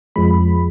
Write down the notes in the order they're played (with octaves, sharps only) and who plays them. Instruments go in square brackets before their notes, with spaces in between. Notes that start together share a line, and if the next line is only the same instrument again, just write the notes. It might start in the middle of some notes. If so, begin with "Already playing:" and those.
[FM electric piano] F2 F3 G#3 B5